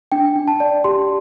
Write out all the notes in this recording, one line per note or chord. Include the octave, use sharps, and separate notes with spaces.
D4 G5
D4
A5
D5
G4 C6